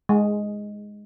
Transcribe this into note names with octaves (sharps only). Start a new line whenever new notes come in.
G#3